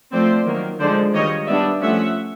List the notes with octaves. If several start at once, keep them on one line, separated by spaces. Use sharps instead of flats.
F3 A3 C4 C5 D5
D#3 F#3 A#3
D3 F3 G#3 C5 D5
D#3 G3 A#3 C#5 D#5
G3 B3 D4 D5 E5
F3 A3 C#4 E5 F#5